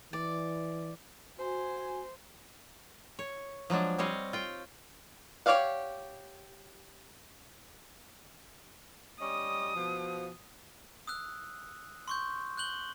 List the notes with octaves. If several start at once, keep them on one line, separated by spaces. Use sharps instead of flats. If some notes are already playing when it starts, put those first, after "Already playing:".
E3 D5
F#4 C5 G#5
C#5
F3 F#3 G#3 D4
G3 C4 C#5 D#5 F5
F4 G5
G4 C#5 D5 F5 F#5
G3 C#4 D#5 D#6
B2 F3
D#6 E6 F#6
C6 C#6 G6
F#6 G6 F#7 G7